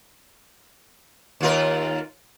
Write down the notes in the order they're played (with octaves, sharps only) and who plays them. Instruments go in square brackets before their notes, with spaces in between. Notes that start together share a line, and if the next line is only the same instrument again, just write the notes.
[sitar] D#2 F4 A#4